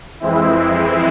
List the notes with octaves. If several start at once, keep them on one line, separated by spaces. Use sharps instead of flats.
F2 E3 G#3 C4 E4